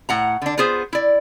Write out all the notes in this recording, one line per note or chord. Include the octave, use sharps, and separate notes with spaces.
A2 F#5 A#5
D3 D4
B3 F4 G#4 C5
E4 D5